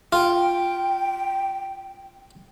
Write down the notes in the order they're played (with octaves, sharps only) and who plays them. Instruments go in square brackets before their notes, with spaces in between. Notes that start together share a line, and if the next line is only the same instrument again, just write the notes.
[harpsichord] F4 [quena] G5